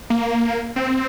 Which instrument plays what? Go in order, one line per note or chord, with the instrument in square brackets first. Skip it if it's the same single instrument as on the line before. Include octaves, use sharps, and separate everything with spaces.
[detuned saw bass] A#3
C4